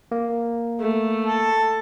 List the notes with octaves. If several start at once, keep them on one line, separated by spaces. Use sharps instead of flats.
A#3
A3
A4